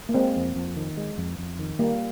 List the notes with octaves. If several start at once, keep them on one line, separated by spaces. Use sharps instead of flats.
A#3
G#3 C4
F2
F2
D#3
G#3
F2
F2
D#3
G3 A#3